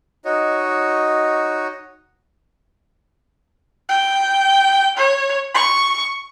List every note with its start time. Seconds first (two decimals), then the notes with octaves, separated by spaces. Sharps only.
0.25 D#4 F#4 C#5 D#5
3.89 G5
4.97 C#5
5.54 C#6